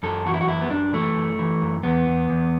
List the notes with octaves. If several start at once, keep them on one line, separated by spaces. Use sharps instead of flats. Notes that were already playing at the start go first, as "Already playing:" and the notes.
F#2 A4
E3 F#4
E4
F#4
F#2 E4
B3
F#2 D4
E3 A3
F#2
E3
F#2
E2 B3
E2
E2